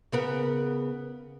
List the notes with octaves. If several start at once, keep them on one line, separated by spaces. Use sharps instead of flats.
C#3 B3 A#4